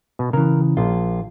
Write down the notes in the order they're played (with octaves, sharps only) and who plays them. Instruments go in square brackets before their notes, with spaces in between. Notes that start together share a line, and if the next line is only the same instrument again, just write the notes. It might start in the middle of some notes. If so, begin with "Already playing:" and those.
[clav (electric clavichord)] B2
[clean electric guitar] C#3 E3 [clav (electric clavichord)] A#4
[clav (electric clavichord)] A#1 [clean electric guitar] F4